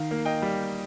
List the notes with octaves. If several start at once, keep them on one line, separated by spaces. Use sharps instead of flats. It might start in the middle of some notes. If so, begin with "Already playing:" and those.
Already playing: D#3 F5
A#3
D#5 G5
G3